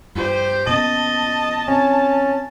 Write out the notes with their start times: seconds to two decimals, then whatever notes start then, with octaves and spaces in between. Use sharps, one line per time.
0.15 G2 G4 C5
0.67 A#2 B3 C#4 D#5 A5
1.68 C4 C#4